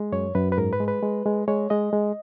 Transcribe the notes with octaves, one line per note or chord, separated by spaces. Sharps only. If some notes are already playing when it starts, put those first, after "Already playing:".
Already playing: G#3
F#2 C#5
F#2 B4
B4
G#2 A#4
B4
G#3
B4
G#3
G#3
G#3 C#5
G#3 D#5
G#3